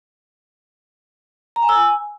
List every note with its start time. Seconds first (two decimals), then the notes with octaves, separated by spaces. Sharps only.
1.56 A#5
1.62 G#5
1.69 E6
1.75 G#5